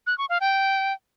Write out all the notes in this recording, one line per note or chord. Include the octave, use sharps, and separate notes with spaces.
F#6
C#6
F5
G5